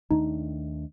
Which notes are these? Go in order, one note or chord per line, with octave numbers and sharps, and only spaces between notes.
D#2 D#3 A3 D4 D#4